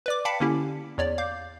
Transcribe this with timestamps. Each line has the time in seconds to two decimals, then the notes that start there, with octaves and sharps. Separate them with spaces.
0.06 B4 D5 D6
0.25 F5 G5 A5 B5 B6 C#7
0.40 D3 A#3 C#4 E4 G4
0.98 E2 C#5 D5
1.18 F5 D6 G6